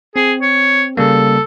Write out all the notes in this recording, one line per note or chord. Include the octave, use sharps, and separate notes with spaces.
C4 G#4
C#5
C#3 G3 A#3 A4